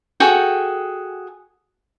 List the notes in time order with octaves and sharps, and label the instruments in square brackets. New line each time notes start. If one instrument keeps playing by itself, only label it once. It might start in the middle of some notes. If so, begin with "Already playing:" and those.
[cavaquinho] F#4 G#4 A4 G5